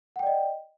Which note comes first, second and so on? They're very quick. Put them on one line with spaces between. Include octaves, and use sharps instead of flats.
F#5 G5 D5 D#5